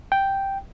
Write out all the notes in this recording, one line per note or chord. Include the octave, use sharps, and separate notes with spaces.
G5